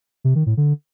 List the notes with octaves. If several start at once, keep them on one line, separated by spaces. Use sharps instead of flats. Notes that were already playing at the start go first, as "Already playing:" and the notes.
C3
D#3
A2
D3